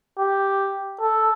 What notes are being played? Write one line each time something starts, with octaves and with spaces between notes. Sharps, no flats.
G4
A4